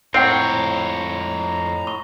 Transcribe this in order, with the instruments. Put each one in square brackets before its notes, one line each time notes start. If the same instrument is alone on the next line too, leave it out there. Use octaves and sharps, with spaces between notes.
[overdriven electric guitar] F2 C#5 [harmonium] A2 A#5 [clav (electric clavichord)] C4 [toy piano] C5 F#5 G5
[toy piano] C#6